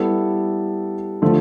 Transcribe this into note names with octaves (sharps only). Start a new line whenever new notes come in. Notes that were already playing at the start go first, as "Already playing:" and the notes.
Already playing: G3 B3 E4 A4
D3 F3 A3